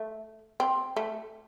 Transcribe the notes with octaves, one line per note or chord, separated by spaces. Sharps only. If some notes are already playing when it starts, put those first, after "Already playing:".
Already playing: A3
C4
A3